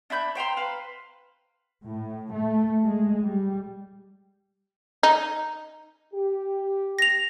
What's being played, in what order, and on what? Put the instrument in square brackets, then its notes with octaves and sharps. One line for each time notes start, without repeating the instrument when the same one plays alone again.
[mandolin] D4 E5 B5 G6
C5 G5 A#5 C6
B4 C5 F5
[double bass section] A2
A3
G#3
G3
[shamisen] D#4
[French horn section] G4
[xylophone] A#6 F7